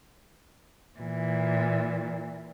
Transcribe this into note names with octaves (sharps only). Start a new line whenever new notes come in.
A#2 E3